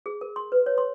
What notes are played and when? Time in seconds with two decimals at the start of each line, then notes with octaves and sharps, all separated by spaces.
0.06 G#4
0.21 A#4
0.36 C6
0.52 B4
0.66 C#5
0.78 C6